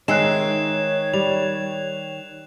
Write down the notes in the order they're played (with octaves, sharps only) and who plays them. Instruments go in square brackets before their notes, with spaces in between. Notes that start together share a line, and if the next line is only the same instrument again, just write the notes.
[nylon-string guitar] D#3 D#4 [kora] G#3 E5 [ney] C#5 [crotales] F#6 C7 E7
[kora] G3 [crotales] F7